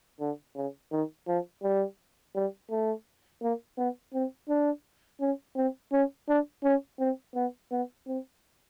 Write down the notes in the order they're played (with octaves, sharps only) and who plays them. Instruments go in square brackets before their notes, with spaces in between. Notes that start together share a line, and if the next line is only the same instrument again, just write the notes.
[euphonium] D3
C#3
D#3
F3
G3
G3
A3
A#3
B3
C4
D4
C#4
C4
C#4
D4
C#4
C4
B3
B3
C4